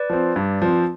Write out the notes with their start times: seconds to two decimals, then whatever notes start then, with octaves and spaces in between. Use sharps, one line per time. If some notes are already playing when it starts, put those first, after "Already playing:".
Already playing: B4 D5
0.10 F3 C4
0.36 G2
0.62 F3 C4